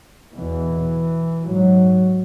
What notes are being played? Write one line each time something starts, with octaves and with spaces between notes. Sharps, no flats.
E2 B2 E3
G#2 F#3